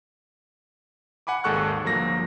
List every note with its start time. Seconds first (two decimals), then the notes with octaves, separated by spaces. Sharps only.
1.27 F#5 G#5 B5 D6
1.44 G#1 D#2 G#3 A4 C#6 F#6
1.84 G1 F3 F#3 A#3 A#6